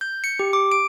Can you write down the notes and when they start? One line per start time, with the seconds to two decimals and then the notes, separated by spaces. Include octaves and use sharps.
0.01 G6
0.24 C#7
0.39 G4
0.53 D6
0.72 D7